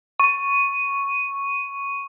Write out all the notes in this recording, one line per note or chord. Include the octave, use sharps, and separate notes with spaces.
C#6 D#7